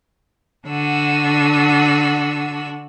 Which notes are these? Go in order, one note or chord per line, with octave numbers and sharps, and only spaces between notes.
D3 D4 F#4 E6